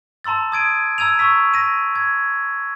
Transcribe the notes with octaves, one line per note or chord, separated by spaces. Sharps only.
A5 A#5 C6 E6 A6
D#6 G#6 D7 D#7
A#5 E6 G#6 D#7 F7
A#5 C#6 E6 B6
A#6 D#7
G#6